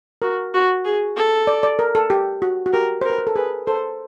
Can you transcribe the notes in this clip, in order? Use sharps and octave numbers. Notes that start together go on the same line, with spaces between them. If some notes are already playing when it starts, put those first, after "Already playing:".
F#4 A#4
F#4
G#4
A4
D5
D5
A#4
A4
G4
F#4
F#4
G4 A#4
A#4 C5
B4
A#4
A4
G#4 B4
A4 C5